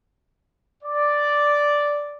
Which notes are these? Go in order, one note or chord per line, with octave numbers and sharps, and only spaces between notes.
D5